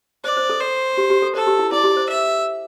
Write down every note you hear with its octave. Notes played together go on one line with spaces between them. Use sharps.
C5 D5
C5
A4
C5
G4
G4
A4
A4 C5
G4
E4
E4 D5
G4
C5
E5